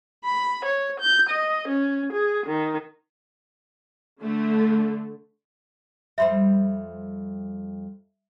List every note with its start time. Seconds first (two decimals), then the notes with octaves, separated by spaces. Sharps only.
0.25 B5
0.66 C#5
1.00 G6
1.30 D#5
1.69 C#4
2.13 G#4
2.46 D#3
4.21 D3 A3
6.18 F2 G3 C5 E5 B5 C6